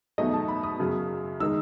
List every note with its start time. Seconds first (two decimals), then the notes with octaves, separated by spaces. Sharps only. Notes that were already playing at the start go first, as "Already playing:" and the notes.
0.18 E2 B2 F#3 A3 D#4 D#5
0.34 A5
0.48 B5
0.63 D#6
0.79 F#2 C#3 F#3
1.40 D#3 G#3 D#4 E6